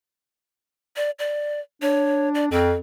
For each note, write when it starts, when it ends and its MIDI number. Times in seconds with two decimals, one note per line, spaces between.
0.96 1.10 74
1.19 1.60 74
1.82 2.51 62
1.82 2.28 73
2.35 2.45 74
2.51 2.75 41
2.51 2.76 60